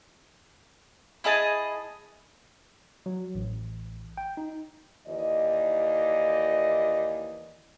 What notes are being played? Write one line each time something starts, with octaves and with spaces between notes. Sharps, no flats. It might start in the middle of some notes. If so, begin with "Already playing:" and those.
E4 G#4 D#5 A5
F#3
A1
G5
D#4
D#2 E3 D5 D#5